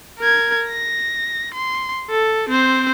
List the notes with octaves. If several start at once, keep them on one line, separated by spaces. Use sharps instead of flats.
A#4 G#6
A#6
C6
A4
C4 C5